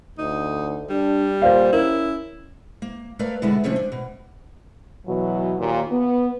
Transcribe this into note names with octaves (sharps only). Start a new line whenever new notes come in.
D2 D#4
G3 D4
A#2 C5 D5 F5
C#4 E4 A#4
A#3
A3 A#4 B4 C#5 D5 F5
B2 D3 G#3 B3 D4 E4
C3 D#3 F3 A3 C#4 D4
D4
B2
B2 E3 F#3
D#2 A#2
B3